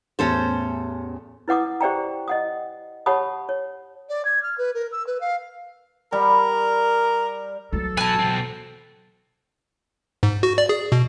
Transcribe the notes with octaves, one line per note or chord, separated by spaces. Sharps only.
A1 E2 C#4 A4 C5
E4 B4 F#5 D6 D#6
G4 C5 D5 G5 A#5
D#5 F#5 D#6
G4 C#5 F#5 A5 B5 D#6
C#5
D5
G#6
F6
B4
A#4
E6
B4
F5
G3 A#4
E3 F#3 A4
F#4 B4 G#5 A5
B2 C4
G#2
F#4
D5
G#4
B2